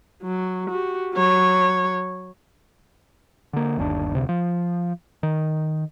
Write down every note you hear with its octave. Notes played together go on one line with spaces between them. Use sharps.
F#3
F#4 G4
F#3 C#5
D3 A#3
G1 D#2 C#4 D4
E1 D2 C3
F3
D#3